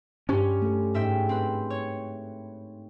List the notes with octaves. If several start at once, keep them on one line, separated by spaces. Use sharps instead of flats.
G2 C#4 G4 C5
A3 A4
G#2 E5 G5
C4 B4
C#5